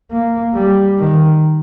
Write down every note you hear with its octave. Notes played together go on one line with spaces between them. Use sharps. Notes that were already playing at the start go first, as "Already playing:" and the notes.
A#3
G3
D#3